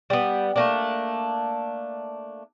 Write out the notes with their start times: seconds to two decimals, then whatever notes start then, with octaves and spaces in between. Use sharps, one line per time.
0.10 G3 B3
0.56 A3 A#3 D4